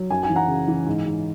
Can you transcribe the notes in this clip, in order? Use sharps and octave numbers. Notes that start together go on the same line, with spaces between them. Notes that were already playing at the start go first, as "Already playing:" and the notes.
Already playing: F#3
F#2 G#5
G#5
E3
F#5 A#5
C#3
E3
G#2
G#2